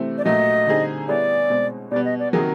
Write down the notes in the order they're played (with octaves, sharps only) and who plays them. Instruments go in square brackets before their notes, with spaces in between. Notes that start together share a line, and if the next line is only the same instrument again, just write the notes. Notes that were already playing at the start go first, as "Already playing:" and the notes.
Already playing: [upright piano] C3 E3 A3 C4
[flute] D5
[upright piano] A#2 F#3 A3 [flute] D#5
[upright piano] D3 G3 C4 D#4 G#4
[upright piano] G3 B3 E4 G#4 C#5 [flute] D5
[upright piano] B2 G#3 C4
[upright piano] B2 G3 B3 [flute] D5
[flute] D#5
D5
[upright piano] C3 D#3 F#3 A#3 [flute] G#4